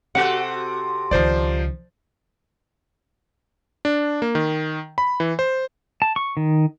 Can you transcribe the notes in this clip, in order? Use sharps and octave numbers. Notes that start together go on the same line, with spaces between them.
C3 F#4 A4 F#5
C#2 D#3 F3 C5 D5
D4
A#3
D#3
B5
E3
C5
A5
C#6
D#3